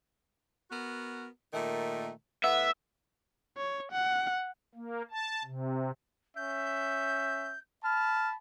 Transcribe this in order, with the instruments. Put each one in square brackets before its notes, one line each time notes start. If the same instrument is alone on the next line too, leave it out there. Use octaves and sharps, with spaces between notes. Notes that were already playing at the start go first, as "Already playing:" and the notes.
[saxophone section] B3 F#4 A#4
A#2 D#3 A3
[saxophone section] A2 B3 [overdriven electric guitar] E5
[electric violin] C#5
F#5
[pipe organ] A#3
A5
C3
[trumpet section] C#4 E5 [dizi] G6
[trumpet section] A5 B5 [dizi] F6